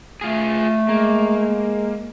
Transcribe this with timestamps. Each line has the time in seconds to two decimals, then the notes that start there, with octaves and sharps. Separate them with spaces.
0.21 A3 F4 G#4
0.89 G#3 A#3